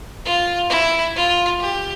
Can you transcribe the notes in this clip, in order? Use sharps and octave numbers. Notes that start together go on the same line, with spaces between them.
F4
E4
F4
G4